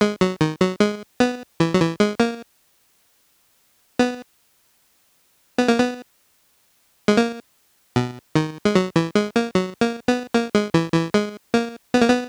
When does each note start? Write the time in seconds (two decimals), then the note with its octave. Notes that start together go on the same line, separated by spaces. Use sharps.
0.01 G#3
0.21 F#3
0.41 D#3
0.61 F#3
0.80 G#3
1.20 B3
1.60 E3
1.74 F#3
1.80 E3
2.00 G#3
2.20 A#3
3.99 B3
5.58 B3
5.68 A#3
5.79 B3
7.08 G#3
7.17 A#3
7.96 B2
8.36 D#3
8.65 G#3
8.75 F#3
8.96 E3
9.15 G#3
9.36 A#3
9.55 F#3
9.81 A#3
10.08 B3
10.34 A#3
10.55 G#3
10.74 E3
10.94 E3
11.14 G#3
11.54 A#3
11.94 B3
12.02 A#3
12.09 B3